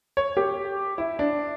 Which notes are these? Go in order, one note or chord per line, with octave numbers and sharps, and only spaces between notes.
C#5
G4
E4
D4